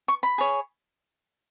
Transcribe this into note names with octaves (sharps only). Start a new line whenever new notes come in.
C#6
B5
G#4 C#5